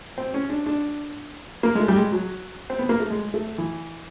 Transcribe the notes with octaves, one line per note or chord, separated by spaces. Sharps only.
C4
C#4
D4
D4
A#3
G#3
A3
G3
G#3
F#3
C4
B3
A#3
A3
G#3
A3
E3